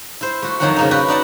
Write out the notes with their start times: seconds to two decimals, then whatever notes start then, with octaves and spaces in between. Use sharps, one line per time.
0.21 E4 C5
0.42 A3 F#4
0.60 F2 D#3 F3 F#3 C4 F#5
0.76 C#3 A#3 D#4
0.91 F#4 B4 D5 E5 G5
1.08 D#4 D5 F#5 A5